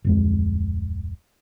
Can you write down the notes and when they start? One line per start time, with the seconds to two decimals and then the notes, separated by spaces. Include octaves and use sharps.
0.04 D1 F2 G#3